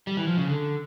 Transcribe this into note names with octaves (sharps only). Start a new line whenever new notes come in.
G3
E3
F3
C#3
D3